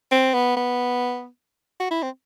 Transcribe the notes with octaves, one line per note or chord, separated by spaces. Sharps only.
C4
B3
B3
F#4
E4
C4